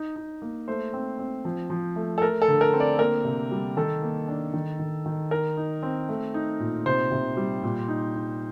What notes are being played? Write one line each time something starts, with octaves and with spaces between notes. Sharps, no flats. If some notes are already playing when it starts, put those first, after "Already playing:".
Already playing: D#4
D#4
A#3
A3 C5
C4
C4
F3
F3
A3
A4
A3 A#4
A4
D3
A#4
C4
D5
A#3 A#4
C3
G3
D#3 A4
A#3
D4
D#3
D#3
D#3
D#4 A#4
D#4
C4
A3
D#4
A#2
C3 C5
C3
G3
A#2
D#4
D#4